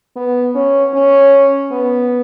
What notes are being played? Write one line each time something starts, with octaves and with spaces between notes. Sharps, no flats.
B3
C#4
C#4
B3